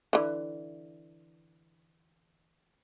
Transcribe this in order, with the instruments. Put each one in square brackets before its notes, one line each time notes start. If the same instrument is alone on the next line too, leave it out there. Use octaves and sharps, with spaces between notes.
[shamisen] D3 E3